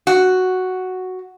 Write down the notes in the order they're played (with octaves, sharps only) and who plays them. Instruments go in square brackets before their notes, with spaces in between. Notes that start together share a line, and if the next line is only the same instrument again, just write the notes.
[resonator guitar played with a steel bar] F#4